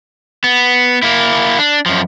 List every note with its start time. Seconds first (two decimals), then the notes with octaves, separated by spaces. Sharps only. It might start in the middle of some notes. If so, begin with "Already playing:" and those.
0.44 B3
1.02 A#3 E4
1.59 D4
1.86 F#2 F3